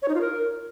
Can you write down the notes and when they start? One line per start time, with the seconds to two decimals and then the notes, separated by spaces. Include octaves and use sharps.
0.02 C#5
0.08 D#4
0.15 F4
0.21 A#4